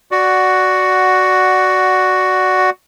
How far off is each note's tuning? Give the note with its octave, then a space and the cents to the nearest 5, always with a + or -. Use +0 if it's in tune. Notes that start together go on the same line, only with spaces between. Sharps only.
F#4 +5 D5 +0 F#5 +0